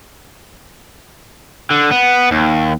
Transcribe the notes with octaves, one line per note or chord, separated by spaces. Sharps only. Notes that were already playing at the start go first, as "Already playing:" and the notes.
D3
B3
D#2